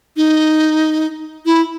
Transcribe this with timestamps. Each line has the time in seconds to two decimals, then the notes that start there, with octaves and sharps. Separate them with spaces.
0.17 D#4
1.46 E4